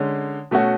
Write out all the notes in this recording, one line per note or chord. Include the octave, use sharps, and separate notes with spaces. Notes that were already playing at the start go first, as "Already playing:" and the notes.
Already playing: D3 G#3 C#4
B2 A3 C#4 F#4